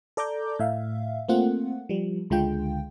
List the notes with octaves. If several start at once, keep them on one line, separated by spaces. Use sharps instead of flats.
A4 D5 A#5 D6 G6
A2 E5 F5
A3 A#3 C4 F4 F#5
F3 G3
C#2 D3 G#3 F4 G5